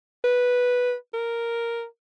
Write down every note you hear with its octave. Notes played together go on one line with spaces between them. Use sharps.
B4
A#4